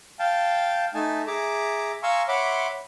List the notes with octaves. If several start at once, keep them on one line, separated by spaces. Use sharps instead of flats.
F5 G5 A5
A3 D#4 G#5 A5
G#4 E5 A#5 D6
F5 G#5 A#5 C6 C#6 E6
C#5 E5 F#5 B5 C6 D6